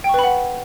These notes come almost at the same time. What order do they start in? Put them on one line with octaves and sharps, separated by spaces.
G5 C#6 B4 B5 F#5